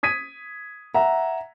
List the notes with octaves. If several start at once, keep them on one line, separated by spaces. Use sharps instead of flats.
D#6 G#6 B6 D#7
E5 F#5 A#5